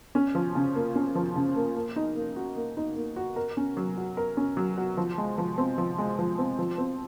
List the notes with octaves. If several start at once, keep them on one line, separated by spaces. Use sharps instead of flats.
C#4
F3
C#3
A#3
C#4
F3
C#3
A#3
A#3
D#4
A#3
F#4
A#3
D#4
A#3
F#4
A#4
C#4
F#3
F#4
A#4
C#4
F#3
F#4
F3
G#3
F3
C4
F3
G#3
F3
C4
F3
C4